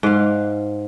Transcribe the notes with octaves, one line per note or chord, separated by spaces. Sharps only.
G#2 F5